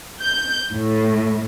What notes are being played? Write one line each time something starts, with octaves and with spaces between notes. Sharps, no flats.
G6
A2